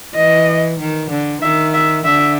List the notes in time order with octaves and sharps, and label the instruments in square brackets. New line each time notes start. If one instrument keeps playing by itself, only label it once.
[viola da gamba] E3 [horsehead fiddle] D#5
[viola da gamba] D#3
D3
[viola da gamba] D#3 [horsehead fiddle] E5
[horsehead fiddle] E5
[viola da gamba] D3 [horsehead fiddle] E5